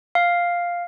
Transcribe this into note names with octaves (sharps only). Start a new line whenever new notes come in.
F5